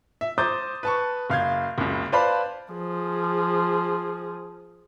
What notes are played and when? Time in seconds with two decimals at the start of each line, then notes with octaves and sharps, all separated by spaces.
0.21 E5
0.38 C5 A#5 D6 D#6 G6 A6
0.83 B4 A5 C#6
1.30 F#1 F5 G6 G#6
1.78 F#1 C#2
2.12 B4 C5 D5 F5 A5 B5
2.73 F3 G#4